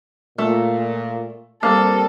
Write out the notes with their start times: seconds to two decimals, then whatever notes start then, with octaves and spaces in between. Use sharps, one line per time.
0.38 A#2 A3
1.63 G3 A#3 C4 A4